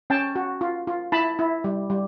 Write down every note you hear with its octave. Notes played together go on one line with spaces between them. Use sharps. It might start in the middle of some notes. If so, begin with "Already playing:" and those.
C#4 G5 A5
F#4
F4
F4
E4 A5 B5
E4
G3
G3